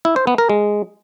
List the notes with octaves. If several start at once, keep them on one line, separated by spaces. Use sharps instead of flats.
E4
C5
B3
A#4
G#3